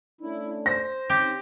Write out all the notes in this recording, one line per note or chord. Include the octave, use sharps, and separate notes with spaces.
A3 C#4 D4 E4
C5 A#6
C4 C#4 D#4 G4